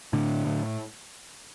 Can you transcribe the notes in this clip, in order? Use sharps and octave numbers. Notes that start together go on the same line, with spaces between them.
A2 D3
A2